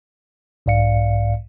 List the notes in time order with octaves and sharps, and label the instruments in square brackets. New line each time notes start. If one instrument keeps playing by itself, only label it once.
[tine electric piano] B1 G#2 D5 F5 C#7